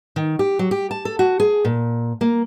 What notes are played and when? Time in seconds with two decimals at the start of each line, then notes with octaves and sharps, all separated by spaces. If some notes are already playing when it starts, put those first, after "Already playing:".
0.16 D#3
0.39 G4
0.59 F#3
0.71 G4
0.91 A5
1.05 A4
1.19 F#4
1.40 G#4
1.65 A#2
2.21 A#3